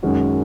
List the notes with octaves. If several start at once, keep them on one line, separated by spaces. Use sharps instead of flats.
F#2 D#3 G#3 C#4 F#4